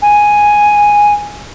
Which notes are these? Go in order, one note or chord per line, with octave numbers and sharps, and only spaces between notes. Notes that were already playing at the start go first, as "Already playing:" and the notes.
G#5